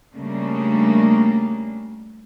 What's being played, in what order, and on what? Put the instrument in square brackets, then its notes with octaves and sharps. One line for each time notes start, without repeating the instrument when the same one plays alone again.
[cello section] C#3 G3 A3 A#3 D4